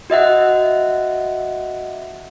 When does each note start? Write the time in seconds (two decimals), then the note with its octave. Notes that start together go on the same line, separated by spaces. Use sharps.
0.10 F#4 D#5 E5 F#5